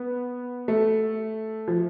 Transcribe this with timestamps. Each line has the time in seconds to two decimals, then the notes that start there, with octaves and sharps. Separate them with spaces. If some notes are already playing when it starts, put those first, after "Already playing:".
Already playing: B3
0.68 A3
1.68 F3